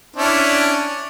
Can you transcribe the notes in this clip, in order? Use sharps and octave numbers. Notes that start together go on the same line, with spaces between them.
C#4 D4 E4